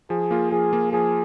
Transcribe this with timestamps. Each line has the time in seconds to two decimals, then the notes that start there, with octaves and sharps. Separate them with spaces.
0.10 F3 G#4
0.31 A#3 F4
0.51 F3 G#4
0.73 A#3 F4
0.92 F3 G#4